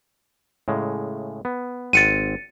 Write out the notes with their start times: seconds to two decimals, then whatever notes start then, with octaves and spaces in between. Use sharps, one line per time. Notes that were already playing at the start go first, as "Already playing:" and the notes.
0.68 A2 C#3 G#3
1.45 B3
1.93 G#1 C4 F#5 A6 C#7 D#7